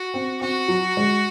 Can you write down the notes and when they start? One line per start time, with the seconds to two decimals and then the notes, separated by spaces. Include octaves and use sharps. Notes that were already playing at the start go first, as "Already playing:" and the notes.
Already playing: F#4
0.14 C4
0.41 C4 F#4
0.68 F#3
0.97 G#3